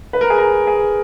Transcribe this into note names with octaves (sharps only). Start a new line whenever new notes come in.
B4
A#4
G#4
A#4
G#4